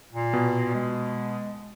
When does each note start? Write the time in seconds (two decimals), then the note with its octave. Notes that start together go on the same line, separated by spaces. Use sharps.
0.12 A#2
0.33 B2
0.75 G#3